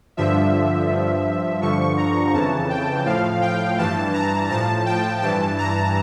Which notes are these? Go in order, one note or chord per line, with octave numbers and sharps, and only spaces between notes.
G2 D3 F3 E5
G2 F3
G2 D3 F3 C#6
A#5
F2 C#3 E3 A5
G5
A2 F3 F5
G5
G2 E3 A5
A#5
A2 F3 A5
G5
G2 E3 A5
A#5